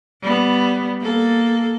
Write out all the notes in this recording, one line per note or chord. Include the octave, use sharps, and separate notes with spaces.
G3 B3
A#3 A4